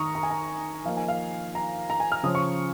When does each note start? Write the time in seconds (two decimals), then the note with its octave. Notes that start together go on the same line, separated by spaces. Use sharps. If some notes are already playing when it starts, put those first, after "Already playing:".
Already playing: D#3 A#5 C#6 D#6
0.15 A#5
0.23 G#5
0.30 A#5
0.85 F3 A#3 D#4 F5
0.97 G#5
1.08 F5
1.55 A#5
1.90 A#5
2.00 G#5
2.12 F6
2.23 C#3 F3 C#4 D#6
2.35 C#6